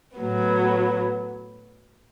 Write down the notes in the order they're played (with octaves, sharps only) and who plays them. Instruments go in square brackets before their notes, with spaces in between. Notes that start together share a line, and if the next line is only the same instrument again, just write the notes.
[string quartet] A2 F#3 B3